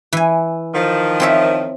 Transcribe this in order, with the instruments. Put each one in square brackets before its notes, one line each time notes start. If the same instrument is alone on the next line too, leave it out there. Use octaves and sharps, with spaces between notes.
[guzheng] E3 G#5
[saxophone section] D#3 F3
[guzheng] C4 C#5 E5